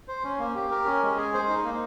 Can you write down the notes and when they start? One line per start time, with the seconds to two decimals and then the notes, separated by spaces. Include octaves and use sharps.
0.08 C5
0.24 C#4
0.39 A#3
0.55 G4
0.71 A#4
0.86 C#4
1.02 G#3
1.17 G#4
1.34 C5
1.49 D#4
1.64 A#3